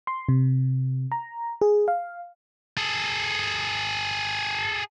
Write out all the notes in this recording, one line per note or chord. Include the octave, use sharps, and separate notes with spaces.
C6
C3
A#5
G#4
F5
G#4 A4